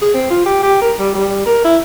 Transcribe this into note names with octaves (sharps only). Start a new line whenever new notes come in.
G#4
C4
F4
G4
G4
A#4
G3
G3
A#4
E4